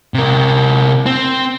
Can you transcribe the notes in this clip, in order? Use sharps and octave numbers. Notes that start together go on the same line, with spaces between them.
C3 A#4
C4